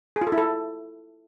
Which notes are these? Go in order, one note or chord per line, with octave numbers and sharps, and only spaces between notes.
G#4
F4
A4
E4
A4